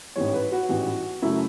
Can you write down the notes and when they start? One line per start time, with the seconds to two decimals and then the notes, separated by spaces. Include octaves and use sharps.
0.16 A1 G#2 E3 G3 C#5
0.34 B4
0.52 F#4
0.69 A1 G#2 E3 G3
1.22 F#2 C#3 F#3 A3 E4